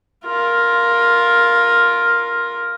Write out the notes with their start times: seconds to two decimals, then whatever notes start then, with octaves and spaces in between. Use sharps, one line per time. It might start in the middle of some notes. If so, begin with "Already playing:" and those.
0.25 F4 A#4